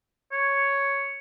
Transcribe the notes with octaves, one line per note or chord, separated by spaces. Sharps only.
C#5